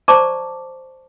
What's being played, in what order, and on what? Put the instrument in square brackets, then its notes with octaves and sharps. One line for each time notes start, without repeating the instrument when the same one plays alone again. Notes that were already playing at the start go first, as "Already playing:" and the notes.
[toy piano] C5 D5 A5 A#5 C#6 D6